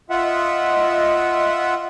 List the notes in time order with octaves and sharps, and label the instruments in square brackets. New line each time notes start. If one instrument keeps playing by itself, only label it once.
[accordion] F4 E5 F#5 [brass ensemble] D#5